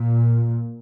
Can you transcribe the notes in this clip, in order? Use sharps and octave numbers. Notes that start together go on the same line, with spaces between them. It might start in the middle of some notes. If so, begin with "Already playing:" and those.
Already playing: A#2